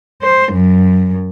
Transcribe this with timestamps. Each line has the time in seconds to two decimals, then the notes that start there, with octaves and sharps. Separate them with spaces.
0.22 C5
0.53 F#2